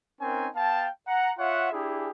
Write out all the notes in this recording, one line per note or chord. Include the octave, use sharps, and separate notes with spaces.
C4 C#4 D#4 A#4 G#5
B3 F5 G5 A5
F#5 A#5
F4 C#5 E5 F#5
D4 E4 G4 G#4